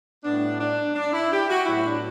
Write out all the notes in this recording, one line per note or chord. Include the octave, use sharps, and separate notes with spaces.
A2 G3 B3 D4
D4
D4
E4
G4
F#4
A2 F#3 B3 E4
D4